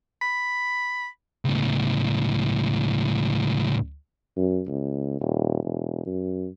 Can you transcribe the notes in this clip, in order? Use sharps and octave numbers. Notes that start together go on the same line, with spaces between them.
B5
C#2 A2
F#2
C#2
D#1
E1
F#2